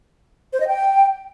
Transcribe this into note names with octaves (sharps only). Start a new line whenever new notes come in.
C5
D#5
G5